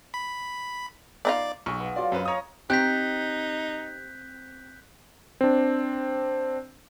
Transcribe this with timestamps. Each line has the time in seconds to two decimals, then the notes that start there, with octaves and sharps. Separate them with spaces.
0.14 B5
1.25 B3 D#4 F4 D5
1.66 B1 G#3 C#6
1.80 B3
1.96 F#3 F4 D5
2.12 F#2 B4
2.26 C#5 D#5 A#5 D#6
2.70 C4 D#4 G4 A#5 F#6 G6 B6
5.41 C4 D4